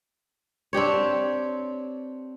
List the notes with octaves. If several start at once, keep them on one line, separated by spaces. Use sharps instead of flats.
C4 D4 G4 C#5